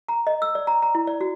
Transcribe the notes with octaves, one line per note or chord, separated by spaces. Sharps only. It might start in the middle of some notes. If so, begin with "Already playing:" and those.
A#5
D#5
E6
D5
A#5
A#5
E4
D5
F#4